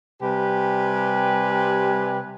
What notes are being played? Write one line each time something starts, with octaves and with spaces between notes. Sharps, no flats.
C3 G3 G4 B4 G#5